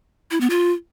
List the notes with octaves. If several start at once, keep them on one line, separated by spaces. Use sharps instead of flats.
E4
B3
F4